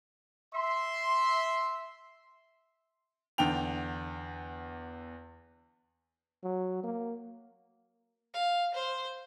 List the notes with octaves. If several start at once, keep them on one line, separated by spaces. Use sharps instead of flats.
E5 C6
E2 D3 G5 F7
F#3
A#3
F5
C5